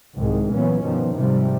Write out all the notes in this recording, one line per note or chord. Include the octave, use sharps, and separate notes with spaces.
C2 G#2 C3 D#3 G#3
A#2 E3 F#3 B3 C#4
G2 B2 D#3 F3
G#2 C3 F3 G3